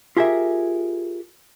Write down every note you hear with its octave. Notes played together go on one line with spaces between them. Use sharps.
F4 G4 G#4 A#4 E5